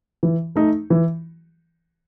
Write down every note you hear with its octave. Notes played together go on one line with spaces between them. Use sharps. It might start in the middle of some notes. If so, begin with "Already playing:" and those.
E3
A3 D#4
E3